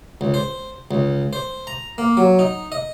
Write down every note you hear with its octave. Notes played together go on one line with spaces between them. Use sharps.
C#2
C5
C#2
C5
A#5
A#3
F#3
D#4
D#5